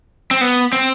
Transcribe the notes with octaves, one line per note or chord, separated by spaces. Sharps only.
C4
B3
C4